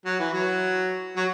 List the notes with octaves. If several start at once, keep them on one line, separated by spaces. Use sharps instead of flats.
F#3
E3
F#3
F#3